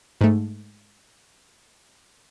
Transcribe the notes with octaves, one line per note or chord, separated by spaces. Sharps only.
G#2 A3